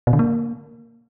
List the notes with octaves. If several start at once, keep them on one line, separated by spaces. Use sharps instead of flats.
B2
D3
A#3